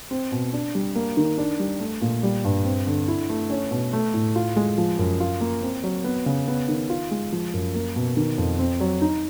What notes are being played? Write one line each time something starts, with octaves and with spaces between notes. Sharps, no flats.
C4
B2
D4
G3
A#3
D#3
D4
G3
A3
A#2
G3
G2
C4
D3
E4
A3
C#4
B2
A3
A2
F4
G#3
F3
F#2
F4
A#3
C4
F#3
B3
C#3
B3
D#3
F4
G#3
F3
F#2
A#3
B2
D#3
F2
C4
F#3
D#4